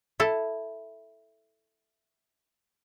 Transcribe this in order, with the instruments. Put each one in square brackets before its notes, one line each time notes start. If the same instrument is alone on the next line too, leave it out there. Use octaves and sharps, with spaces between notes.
[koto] E4 A4